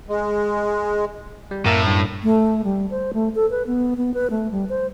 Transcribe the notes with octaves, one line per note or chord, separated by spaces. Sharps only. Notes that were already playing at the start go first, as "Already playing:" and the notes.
G#3
G3
F#2 A2 A#3 A#4 E5
G2
A3
G3
C5
A3
A4
B4
B3
B3
B4
A3
G3
C5